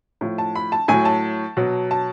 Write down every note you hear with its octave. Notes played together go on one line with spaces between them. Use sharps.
A2 F3
A5
B5
A5
A2 F#3 G#5
A5
B2 F#3
A5